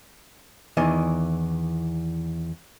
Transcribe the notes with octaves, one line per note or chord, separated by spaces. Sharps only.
E2 D#3 E3 D#5